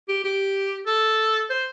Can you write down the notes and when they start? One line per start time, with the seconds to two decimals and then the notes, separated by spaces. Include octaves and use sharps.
0.09 G4
0.24 G4
0.87 A4
1.50 C5